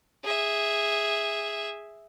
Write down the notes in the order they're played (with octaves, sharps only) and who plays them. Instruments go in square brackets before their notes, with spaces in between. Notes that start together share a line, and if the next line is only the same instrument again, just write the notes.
[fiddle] G#4 E5